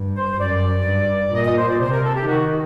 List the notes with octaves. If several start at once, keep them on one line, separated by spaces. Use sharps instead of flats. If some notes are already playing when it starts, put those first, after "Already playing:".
Already playing: G2
C5
F#2 D5
G2
A#2 D#5
D#5
C5
D5
C3 C5
A#4
A4
G4
D#3 F#4